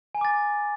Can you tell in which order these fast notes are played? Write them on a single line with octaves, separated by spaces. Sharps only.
G#5 A#5 D6 A6